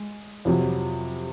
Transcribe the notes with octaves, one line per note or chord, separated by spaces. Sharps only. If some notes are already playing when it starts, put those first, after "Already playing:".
Already playing: G#3
F2 C3 F#3